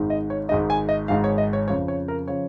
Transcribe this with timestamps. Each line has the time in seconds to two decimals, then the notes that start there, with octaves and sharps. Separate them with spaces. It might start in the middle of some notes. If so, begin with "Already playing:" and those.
Already playing: G#1 G#2 G#3 D#4
0.10 D#5
0.30 C#5
0.49 G#1 G#2 G#3 D#4 D#5
0.70 G#5
0.89 D#5
1.08 G#1 G#2 G#3 D#4 F5
1.24 C#5
1.38 D#5
1.53 C#5
1.68 F2 C#3 F3 C#5
1.88 C#5
2.08 A#4
2.28 C#3 F3 C#5